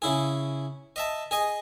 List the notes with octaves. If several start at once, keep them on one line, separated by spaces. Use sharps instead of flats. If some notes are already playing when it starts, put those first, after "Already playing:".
C#3 E4 G#4
D#5 E5 A5
G#4 D#5 G#5